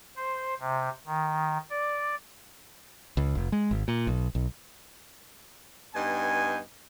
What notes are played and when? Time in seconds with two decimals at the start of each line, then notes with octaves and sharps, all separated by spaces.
0.16 C5
0.60 C3
1.06 D#3
1.70 D5
3.17 C#2
3.35 F1
3.52 G#3
3.71 G#1
3.88 A#2
4.07 B1
4.35 B1
5.94 G2 B3 D#4 G#5